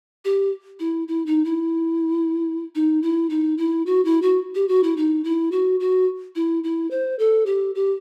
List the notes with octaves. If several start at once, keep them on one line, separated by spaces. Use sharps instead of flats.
G4
E4
E4
D#4
E4
D#4
E4
D#4
E4
F#4
E4
F#4
G4
F#4
E4
D#4
E4
F#4
F#4
E4
E4
C5
A4
G4
G4